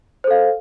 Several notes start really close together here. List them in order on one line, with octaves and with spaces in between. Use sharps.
C5 A4 F5